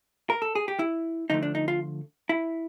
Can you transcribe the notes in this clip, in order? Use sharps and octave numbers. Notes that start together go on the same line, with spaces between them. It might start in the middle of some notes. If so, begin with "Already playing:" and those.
A#4
A4
G#4
G4
E4
D3 F3 A3 D#4
D4
D#4
F4
E4